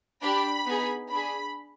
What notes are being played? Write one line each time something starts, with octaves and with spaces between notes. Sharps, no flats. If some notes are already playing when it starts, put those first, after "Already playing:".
D4 G4 B5
B3 D#4 G#4
D4 G#4 B5